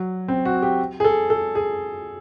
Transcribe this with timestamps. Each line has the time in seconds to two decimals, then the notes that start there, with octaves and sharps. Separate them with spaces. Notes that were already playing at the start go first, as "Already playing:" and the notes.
Already playing: F#3
0.28 C4
0.45 F#4
0.62 G4
1.00 G#4
1.04 A4
1.30 A4
1.55 G#4